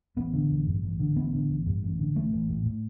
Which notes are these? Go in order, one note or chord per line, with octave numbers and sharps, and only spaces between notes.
A1 B3
D3
A1
G2
A1
D3
A1 B3
D3
A1
G2
A1
D3
A1 A3
A1
A2
A2